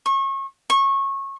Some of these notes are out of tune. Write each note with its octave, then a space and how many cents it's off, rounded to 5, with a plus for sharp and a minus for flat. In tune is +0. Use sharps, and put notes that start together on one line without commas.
C#6 -30
C#6 -20